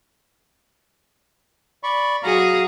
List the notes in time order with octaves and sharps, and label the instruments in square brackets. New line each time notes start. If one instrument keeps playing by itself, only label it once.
[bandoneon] D5 B5 C#6
[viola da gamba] F#3 F#4 G#4 [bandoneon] F5 A#5